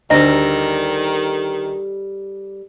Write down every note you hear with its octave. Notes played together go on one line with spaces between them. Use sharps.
D2 D#3 G3 A4 D#5 A#5 A#6